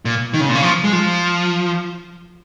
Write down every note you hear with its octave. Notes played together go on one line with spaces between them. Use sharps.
A#2
D#3
C#3
A#2
C#3
F3
G#3
F3